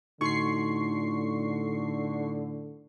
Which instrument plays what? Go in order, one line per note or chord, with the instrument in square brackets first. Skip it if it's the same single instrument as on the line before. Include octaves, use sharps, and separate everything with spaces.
[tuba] A2 [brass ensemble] D3 [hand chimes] D#4 F#4 C6 [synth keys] C#6 C7